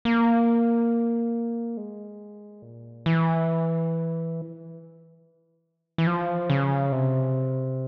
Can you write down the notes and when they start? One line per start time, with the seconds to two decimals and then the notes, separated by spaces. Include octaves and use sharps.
0.05 A#3
1.77 G#3
2.62 A#2
3.06 E3
5.98 E3
6.07 F3
6.50 C#3
6.92 C3